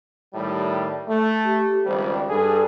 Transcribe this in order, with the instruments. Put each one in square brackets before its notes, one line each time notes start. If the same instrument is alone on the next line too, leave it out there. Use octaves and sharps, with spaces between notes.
[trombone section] A2 D#3 G3
A3
[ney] G4
[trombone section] G#1 C#2 G3 [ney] C5
[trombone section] G2 G#4 [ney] A4